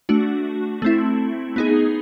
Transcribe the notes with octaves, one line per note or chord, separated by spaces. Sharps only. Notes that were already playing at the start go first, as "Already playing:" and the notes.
A3 D4 F#4
A3 C4 E4
B3 D#4 G#4